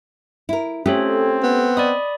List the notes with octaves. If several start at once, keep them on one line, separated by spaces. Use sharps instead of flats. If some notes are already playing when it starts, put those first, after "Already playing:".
E4 A#4
A3 C4 C#4 F4 G4 A4 C#5
B3
D5 D#5 B5 D#6